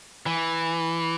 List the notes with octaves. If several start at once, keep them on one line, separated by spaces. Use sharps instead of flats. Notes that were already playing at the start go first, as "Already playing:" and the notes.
E3